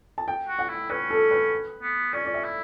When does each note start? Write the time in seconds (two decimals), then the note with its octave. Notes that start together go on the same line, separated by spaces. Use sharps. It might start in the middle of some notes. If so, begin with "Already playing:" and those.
0.18 A5
0.28 G5
0.48 F#4
0.59 F#5
0.69 E4
0.90 C#4 B4
1.11 A4
1.31 B4
1.82 B3
2.13 C#4 D5
2.25 D5
2.34 E5
2.44 E4